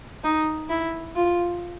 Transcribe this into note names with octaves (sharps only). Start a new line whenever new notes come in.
D#4
E4
F4